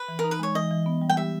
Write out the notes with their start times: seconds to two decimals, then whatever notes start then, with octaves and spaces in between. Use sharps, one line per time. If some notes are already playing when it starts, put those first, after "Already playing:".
Already playing: B4
0.08 E3
0.19 A#4
0.24 D#4
0.31 B4
0.39 G#3 C#5
0.55 E3 D#5
0.71 E3
0.86 B3
1.02 G3
1.09 G5
1.17 G4 E5